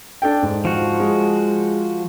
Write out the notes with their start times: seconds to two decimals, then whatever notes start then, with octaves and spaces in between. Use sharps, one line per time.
0.22 D4 A4 G5
0.42 G#2
0.65 F3 F#4
1.00 G#3